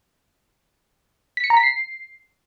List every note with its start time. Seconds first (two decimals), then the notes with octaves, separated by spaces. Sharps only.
1.37 B6
1.44 C#7
1.50 A#5
1.57 B6
1.63 C7